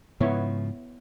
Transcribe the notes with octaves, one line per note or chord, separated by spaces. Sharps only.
G#2 C#3 F3 B3 E4 C#5